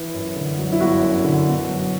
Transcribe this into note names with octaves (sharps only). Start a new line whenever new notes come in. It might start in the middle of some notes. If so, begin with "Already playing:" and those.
Already playing: E3
F#2
D3
F#3
E4
G1 F#4
F#2
D3
B2
F#3